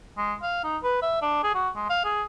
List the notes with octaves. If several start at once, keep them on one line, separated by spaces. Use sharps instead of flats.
G#3
F5
D#4
B4
E5
D4
G#4
F#4
G#3
F5
G#4